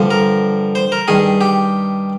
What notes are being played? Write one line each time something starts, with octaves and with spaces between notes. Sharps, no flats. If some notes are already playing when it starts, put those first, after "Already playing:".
Already playing: G2 D3 F3
A#4
C5
A#4
G2 D#3 G#4
G4